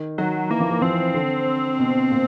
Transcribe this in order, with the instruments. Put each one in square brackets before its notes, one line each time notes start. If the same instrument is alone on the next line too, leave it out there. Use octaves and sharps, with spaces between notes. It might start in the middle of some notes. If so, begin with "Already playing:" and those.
Already playing: [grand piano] D#3
[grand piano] D#3 [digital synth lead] F#3
[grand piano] E3 [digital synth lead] A#3
[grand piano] F3
E3
[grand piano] F3 [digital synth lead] C4
[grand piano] E3
D3
B2
A#2